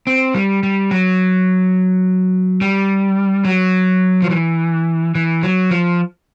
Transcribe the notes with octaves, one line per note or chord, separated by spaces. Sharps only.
C4
G3
G3
F#3
G3
F#3
F3
E3
E3
F#3
F3